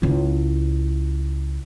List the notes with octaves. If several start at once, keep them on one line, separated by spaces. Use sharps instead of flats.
C#2 E4